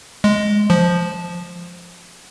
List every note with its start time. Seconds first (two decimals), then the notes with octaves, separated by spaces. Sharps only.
0.24 G#3
0.70 F3